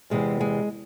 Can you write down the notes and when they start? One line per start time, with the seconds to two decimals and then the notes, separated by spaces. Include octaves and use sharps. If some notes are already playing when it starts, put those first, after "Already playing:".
0.10 E2 C3 E3 G#3
0.41 G#3